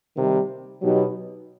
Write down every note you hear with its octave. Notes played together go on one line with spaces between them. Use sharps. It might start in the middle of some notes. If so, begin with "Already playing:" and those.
C3 D#3 G3 A#3
B2 F#3 B3 D#4 G4